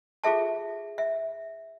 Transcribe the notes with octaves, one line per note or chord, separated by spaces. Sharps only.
F4 G#4 A4 E5 A5
E5